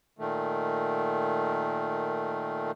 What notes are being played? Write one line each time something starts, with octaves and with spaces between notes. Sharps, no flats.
A#2 D#3 A3